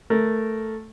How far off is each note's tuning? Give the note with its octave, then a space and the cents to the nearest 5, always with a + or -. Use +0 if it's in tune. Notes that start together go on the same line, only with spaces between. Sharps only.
A3 +0 A#4 +0